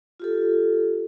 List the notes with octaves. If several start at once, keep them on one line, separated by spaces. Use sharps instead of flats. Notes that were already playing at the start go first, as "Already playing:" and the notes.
F4 G4 A4